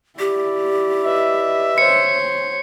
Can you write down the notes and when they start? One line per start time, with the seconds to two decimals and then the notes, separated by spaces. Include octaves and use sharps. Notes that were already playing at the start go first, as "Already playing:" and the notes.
0.19 E4 G4 D5
1.04 B4 D#5 E5
1.78 C5 C#5 C#7